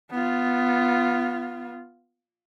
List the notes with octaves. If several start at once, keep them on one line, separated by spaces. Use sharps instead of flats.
B3 F4